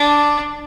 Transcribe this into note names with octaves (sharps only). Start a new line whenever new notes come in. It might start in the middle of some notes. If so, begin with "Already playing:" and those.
Already playing: D4